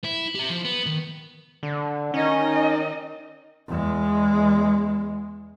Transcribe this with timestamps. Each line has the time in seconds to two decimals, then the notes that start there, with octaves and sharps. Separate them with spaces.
0.04 E4
0.35 G4 E5
0.49 F3
0.64 B3
0.86 D#3
1.63 D3
2.14 D#3 C#4 D#4 D#5
3.68 E2 G#3